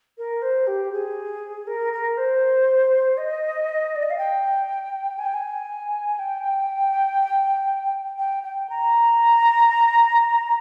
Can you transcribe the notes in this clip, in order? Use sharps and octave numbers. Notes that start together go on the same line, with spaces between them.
A#4
C5
G4
G#4
A#4
A#4
C5
D#5
D5
D#5
F5
G5
G#5
G5
G#5
G5
G5
G5
A#5